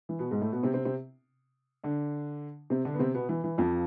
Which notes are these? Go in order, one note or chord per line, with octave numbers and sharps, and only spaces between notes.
E3
B2 B3
G#2 G#3
A2 A3
B2 B3
C3 C4
C3 C4
C3 C4
D3 D4
C3 C4
D3 D4
B3
C3 C4
B2 B3
E3
E3
F2 F3